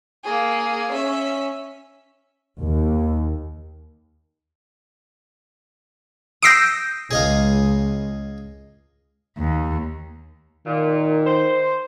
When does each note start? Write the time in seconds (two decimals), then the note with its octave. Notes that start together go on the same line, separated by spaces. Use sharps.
0.24 A#3 G#4
0.92 C#4 E5
2.61 D#2
6.42 D#6 E6 G6 A#6 C7 D7
7.11 C#2 G#4 D#5 F5
9.38 D#2
10.66 A#2 D#3
11.26 C5